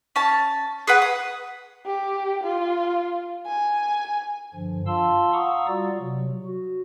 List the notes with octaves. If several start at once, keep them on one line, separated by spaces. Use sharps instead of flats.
C#4 A5
G#4 B4 F#5
D#6
G4
F4
G#5
G2 D3 F3
F4 F5 A5 C6 E6
F5 F#5 A#5 C#6 D#6 E6
G3 F4 F#4 D5
C3 F#3
F#4